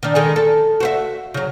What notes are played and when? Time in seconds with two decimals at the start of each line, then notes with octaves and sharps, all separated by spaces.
0.03 D#3 D4
0.15 D#3 G#3 A4
0.36 A4
0.80 F#4 C5 E5
1.34 C#3 F#3